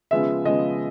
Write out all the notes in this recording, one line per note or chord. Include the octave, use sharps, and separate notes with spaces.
C#3 F3 G#3 B3 E5
C#3 F3 G#3 B3 D#5